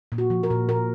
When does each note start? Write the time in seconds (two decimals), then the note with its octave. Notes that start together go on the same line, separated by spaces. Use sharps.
0.12 A#2
0.18 F#4
0.30 F3
0.43 A#4
0.50 A#2
0.69 A#2 A#4